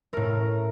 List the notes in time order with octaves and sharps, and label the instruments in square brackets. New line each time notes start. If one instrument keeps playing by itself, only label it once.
[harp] A2 A3 A#4